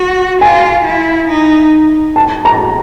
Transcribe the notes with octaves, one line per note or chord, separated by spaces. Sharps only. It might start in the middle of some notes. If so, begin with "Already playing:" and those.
Already playing: F#4
F4 G#5
E4
D#4
A5
A#5